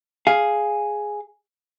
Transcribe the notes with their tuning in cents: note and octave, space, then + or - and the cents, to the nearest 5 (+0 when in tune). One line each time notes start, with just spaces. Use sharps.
G#4 +0 F5 +0